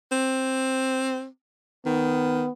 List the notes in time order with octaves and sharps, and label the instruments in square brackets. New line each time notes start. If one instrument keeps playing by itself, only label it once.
[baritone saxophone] C4
[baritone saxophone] D#3 [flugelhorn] B3